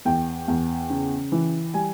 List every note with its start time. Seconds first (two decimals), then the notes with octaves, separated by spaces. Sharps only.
0.05 E2 G5
0.48 E2
0.90 C#3
1.32 E3
1.74 G3 G#5